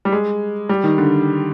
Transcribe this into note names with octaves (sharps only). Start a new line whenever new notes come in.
G3
G#3
G3
D#3
D3